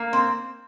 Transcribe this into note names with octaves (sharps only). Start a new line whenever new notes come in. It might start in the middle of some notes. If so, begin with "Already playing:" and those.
Already playing: A#3
C4